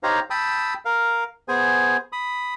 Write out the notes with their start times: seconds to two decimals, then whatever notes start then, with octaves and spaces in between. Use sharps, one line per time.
0.03 D#4 G4 C5 C#5 F5 A#5
0.30 G5 A5 B5 D#6 E6
0.85 A#4 F5
1.48 B3 G#4 C5 G#5
2.13 B5 D#6